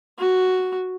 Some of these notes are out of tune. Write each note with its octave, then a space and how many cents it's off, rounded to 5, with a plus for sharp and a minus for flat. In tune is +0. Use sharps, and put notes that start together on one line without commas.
F#4 +0